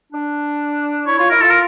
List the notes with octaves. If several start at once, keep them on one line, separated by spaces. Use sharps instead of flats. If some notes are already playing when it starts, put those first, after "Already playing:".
D4
E4 C#5
F4 C#5
E4 A#4
F4 A4
A#4